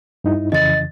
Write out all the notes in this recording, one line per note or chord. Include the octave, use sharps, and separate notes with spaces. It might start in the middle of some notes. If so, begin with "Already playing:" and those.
G2 D#4 E4
F2 C#3 E3 D#5 A6